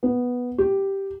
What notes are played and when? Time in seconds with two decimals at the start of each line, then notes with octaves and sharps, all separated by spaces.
0.03 B3
0.58 G4